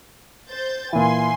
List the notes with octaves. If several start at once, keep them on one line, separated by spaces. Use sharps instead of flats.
C5 G6 A6
A#2 E3 G#5 C6